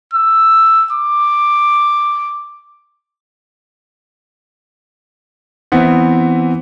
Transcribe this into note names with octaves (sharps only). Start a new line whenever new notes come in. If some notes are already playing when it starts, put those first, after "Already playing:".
E6
D6
E3 B3 C4